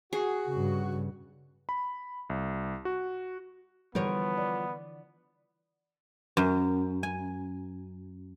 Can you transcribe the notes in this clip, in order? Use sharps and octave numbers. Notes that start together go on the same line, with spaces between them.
F#4 G#4
G2 C#3
B5
C2
F#4
D3 E3 F3 G3 B3 A#4 C#5
D5
F#2
G#5